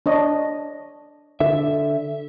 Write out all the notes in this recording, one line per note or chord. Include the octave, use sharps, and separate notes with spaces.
D4 C#5 D#5
D3 E5